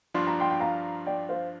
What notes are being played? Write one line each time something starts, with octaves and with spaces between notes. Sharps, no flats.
G2 F3 D4 F4 C6
A#5
G5 C6
G5
F5 A#5
D5 G5
C5 F5